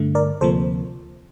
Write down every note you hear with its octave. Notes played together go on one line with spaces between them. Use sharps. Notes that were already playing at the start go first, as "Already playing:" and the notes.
Already playing: G2 D3 A3
A#4 D5
D2 C3 F3 A#3 A4 C5